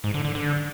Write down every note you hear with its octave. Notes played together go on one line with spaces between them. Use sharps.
G#2
D3
D3
D3